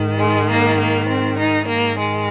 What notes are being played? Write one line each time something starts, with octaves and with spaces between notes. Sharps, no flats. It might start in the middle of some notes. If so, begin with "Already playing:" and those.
Already playing: G#2 D#3
G#3
A#3
A#3
C4
D#4
G#2 D#3 A#3
G#3